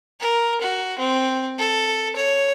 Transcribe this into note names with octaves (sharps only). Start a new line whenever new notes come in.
A#4
F#4
C4
A4
C#5